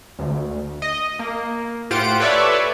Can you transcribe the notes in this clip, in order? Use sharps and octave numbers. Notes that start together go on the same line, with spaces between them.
D2
D#5
A#3
A2 F4 G4 C5 F#5 D7
A4 B4 C#5 D5 E5